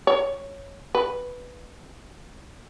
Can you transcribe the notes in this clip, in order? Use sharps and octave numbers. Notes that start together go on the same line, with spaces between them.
C#5
B4